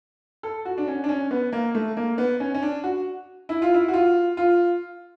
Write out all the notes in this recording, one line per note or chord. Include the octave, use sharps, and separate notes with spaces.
A4
F#4
D4
C#4
D4
C#4
B3
A#3
A3
A#3
B3
C#4
C#4
D4
F#4
E4
F4
E4
F#4
F4
F4